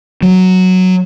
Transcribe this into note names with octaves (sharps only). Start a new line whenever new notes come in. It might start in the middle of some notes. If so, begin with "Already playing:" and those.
F#3